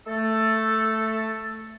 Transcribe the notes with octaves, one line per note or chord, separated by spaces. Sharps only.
A3 A4